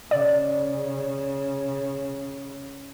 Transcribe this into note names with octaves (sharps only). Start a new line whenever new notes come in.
C#3 D5